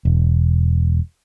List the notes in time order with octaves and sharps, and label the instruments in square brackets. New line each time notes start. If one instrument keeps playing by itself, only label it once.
[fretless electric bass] E1